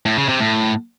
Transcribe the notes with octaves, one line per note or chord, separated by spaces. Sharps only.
A2
C#3
C3
A2